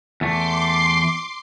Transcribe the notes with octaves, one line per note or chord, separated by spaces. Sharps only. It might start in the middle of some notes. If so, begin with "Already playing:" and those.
E2 A3 C6 D6 C7